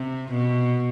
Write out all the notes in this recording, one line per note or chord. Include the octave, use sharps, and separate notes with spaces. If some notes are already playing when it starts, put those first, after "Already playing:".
Already playing: C3
B2